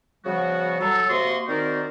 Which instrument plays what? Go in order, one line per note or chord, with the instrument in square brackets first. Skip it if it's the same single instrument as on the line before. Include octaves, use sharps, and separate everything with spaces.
[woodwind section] C#3 F3 G3 B3 F#4
F#3 A4
C3 A#3 F#4 D#5 C6
D#3 C4 F#4 A#4 C5 D5